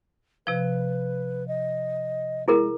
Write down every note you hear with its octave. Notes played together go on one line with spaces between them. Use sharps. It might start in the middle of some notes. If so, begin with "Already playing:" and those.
C3 F3 B4
D#5
G#3 E4 G#4 A#4